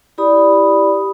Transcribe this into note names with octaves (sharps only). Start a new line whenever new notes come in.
E4 G4 D5 B5 D#6